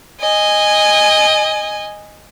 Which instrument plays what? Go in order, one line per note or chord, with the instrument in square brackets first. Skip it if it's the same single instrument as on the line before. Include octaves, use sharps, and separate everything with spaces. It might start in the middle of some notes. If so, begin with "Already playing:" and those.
[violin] D#5 G#5